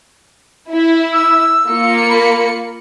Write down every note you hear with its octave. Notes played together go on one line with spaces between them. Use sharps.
E4
E6
A#3 F4 C#7
B5